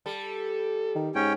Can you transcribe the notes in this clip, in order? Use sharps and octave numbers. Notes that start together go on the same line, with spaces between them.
G3 A4
D#3
G#2 C#4 C#5 G5